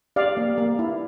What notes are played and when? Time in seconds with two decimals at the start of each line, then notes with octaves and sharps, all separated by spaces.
0.16 G4 D5 F5
0.37 A#3
0.58 A#3
0.79 E4